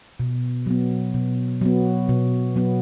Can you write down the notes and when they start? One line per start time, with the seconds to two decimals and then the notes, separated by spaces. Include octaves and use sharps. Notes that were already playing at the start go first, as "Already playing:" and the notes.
0.20 B2
0.66 F#3 B3
1.14 B2
1.61 F#3 B3
2.09 B2
2.56 F#3 B3